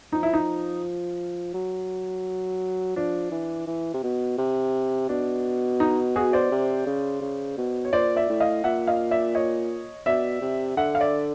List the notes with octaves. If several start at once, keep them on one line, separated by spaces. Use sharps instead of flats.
F3 D#4
E4
D#4
F#3
F3 D4
E3
E3
C3
B2
C3
B2 D4
D#4
F#4 G#4
C5 D5
C3
C#3
C#3
B2
C#5
A#2 C5 D5
D5 E5
A2
D#5 F5
A#2 E5 F#5
D#5 F5
D5 E5
C#5 D#5
B2 D5 E5
C3
D3 E5 F#5
F5
D5 E5